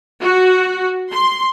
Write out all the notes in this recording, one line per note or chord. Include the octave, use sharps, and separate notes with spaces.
F#4
C6